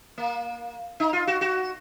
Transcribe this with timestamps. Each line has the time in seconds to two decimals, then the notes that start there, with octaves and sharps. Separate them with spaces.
0.18 A#3
1.00 D#4
1.13 F4
1.27 F#4
1.41 F#4